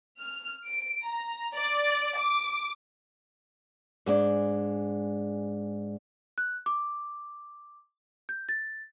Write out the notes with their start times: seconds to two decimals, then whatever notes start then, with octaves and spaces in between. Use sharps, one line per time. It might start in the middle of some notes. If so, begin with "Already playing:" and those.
0.19 F6
0.66 D7
1.03 A#5
1.55 D5
2.17 D6
4.06 G#2 G#3 D4
6.38 F#6
6.66 D6
8.29 G6
8.49 A6